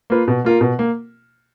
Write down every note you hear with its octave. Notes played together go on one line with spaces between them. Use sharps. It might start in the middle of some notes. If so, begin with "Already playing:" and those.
A#3 F4 B4
B2
A#3 F4 A#4
B2
A#3